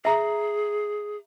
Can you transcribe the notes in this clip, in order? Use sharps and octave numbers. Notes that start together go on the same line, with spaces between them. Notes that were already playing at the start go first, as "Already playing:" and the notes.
G#4 E5 A#5